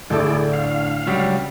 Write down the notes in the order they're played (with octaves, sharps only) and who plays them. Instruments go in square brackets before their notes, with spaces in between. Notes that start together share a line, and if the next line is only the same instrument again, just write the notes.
[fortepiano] D2 A4 [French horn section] A2 D3 D4 [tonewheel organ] E4 G#4 D5
[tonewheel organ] F5
[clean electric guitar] C#2 F#3 G3